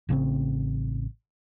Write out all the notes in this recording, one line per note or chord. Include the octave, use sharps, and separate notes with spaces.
A1 C#3 E3 C4